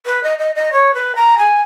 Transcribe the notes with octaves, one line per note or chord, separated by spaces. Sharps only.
B4
D#5
D#5
D#5
C#5
B4
A#5
G#5